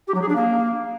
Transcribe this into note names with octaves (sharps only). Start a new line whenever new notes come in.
G4
F#3
G#4
D4
A#3